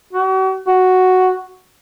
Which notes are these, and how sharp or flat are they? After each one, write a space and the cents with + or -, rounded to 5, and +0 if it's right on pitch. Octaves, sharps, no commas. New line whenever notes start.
F#4 +40
F#4 +0